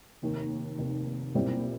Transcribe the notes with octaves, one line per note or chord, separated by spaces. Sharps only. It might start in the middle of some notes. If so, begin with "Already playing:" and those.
F1 D#2 D#3
F1 D#2 D#3
B1 A#2 G3 C4 E4